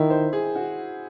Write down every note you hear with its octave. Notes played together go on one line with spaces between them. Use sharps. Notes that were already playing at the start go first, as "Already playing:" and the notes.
Already playing: D#3 E4
C5
G#4
F#4